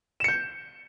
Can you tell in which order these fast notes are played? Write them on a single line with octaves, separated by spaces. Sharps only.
E7 C#7 G6